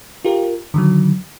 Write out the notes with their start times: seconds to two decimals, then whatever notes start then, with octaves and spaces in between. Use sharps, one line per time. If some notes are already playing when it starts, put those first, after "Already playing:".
0.25 F4 G4 A#4
0.74 D3 D#3 F#3